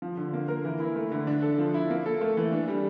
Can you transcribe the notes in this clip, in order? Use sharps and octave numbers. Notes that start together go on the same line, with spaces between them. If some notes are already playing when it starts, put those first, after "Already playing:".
F3
D3
A#3
A#4
E3
E4
A3
D3
D4
A4
F3
E4
A#3
A4
A3
E3
D4
G3